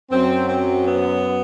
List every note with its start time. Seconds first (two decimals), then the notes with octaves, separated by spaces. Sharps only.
0.11 F#2 F#3 C4
0.48 C4
0.86 B3